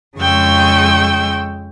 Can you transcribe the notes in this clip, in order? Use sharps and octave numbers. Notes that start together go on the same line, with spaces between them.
F2 C#3 G#3 G5 C#6 E6